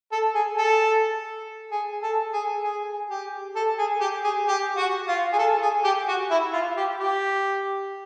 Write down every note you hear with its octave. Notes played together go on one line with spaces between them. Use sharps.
A4
G#4
A4
G#4
A4
G#4
G#4
G4
A4
G#4
G4
G#4
G4
F#4
F4
G#4
A4
G#4
G4
F#4
E4
F4
G4
G4